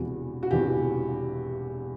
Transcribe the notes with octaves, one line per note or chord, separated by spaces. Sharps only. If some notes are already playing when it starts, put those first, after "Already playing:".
Already playing: E1 E2 C3 E3 F#4
F#4
E1 E2 C3 E3 G4